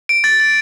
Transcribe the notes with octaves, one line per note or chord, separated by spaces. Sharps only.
D7
A6
A6